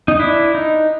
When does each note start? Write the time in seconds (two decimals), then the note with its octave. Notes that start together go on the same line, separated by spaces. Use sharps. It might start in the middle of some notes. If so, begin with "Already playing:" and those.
0.08 D#4
0.19 D4 E4
0.55 D#4